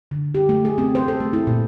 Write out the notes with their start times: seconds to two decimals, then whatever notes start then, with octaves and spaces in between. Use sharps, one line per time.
0.11 D3
0.34 G4
0.49 A3
0.65 G#4
0.78 C4
0.95 C5
1.08 A4
1.20 A3
1.33 E4
1.47 A#2